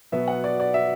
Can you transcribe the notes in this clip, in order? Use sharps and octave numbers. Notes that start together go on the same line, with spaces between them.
B2 F#3 B3 E5
F#5
D5
D5
E5